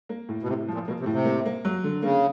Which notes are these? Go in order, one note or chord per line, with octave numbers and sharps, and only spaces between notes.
A#3
A2
B2
A2 C3
F3
A#2
B2 A#3
C3
A2
C3
A#3
A#3
F#3
D3
C#3 A#3